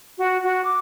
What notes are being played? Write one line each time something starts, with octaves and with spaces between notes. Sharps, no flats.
F#4
F#4
D6